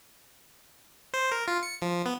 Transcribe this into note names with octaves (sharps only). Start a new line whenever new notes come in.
C5
A#4
F4
C#7
F3
B3